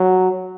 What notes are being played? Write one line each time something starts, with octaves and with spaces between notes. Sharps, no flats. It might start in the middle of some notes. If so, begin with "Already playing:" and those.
Already playing: F#3